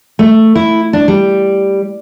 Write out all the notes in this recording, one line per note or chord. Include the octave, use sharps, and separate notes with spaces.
A3
E4
D4
G3